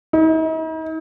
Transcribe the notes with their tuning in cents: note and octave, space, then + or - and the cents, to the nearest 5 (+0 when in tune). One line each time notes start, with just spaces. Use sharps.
D#4 +45